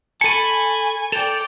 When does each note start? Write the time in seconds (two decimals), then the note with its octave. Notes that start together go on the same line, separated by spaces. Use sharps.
0.21 A4 G#5 A5 B5 C#6 C#7 D#7
1.12 A4 D5 G5 E7 F7